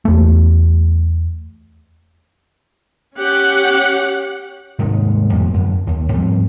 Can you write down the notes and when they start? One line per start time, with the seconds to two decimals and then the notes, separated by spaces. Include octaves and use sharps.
0.05 E2 A3
3.19 C#4 G4 F#5
4.79 D#1 G#2 C3 D#3
5.33 F2 A2 C3
5.54 F#2 D3
5.87 D#2
6.14 G#2 F3 G3 C4